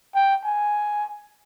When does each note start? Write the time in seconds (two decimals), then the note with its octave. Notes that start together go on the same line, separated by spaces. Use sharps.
0.15 G5
0.44 G#5